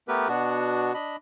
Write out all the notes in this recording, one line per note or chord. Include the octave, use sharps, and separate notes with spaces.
A3 B3 G4 A#4 B4
B2 B3 D4 F#4
D4 D#5 B5